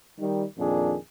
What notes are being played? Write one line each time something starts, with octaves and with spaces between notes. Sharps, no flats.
D#3 G3
F2 A#2 D#3 D4 G#4